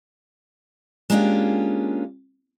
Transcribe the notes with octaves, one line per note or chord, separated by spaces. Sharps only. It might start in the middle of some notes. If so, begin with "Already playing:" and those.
G#3 A#3 C#4 D4 F4 G4